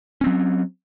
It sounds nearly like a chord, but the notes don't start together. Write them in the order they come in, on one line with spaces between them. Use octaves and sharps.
C#4 C4 F#3